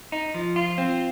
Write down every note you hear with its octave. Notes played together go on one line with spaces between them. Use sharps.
D#4
F3
F4
C4